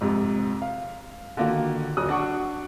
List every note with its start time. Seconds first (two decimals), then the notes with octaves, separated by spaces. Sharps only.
0.01 F2 G#2 C3
0.62 F5
1.37 D3 D#3 A#3 F4 F#4
1.97 D#1 F#3 D#6 F#6
2.09 D4 F#4 F#5 C#6